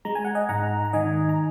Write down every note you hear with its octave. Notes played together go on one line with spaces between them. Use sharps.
G#3 A#5
G#5
F#5
D#5 G#5
G#2 F#5 A#5
A#5
D#3 D#5 G#5
A#5